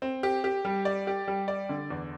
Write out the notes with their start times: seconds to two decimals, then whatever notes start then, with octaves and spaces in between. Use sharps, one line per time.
0.02 C4
0.23 G4
0.44 G4
0.65 G3
0.85 D5
1.07 G4
1.28 G3
1.48 D5
1.69 D3
1.90 E2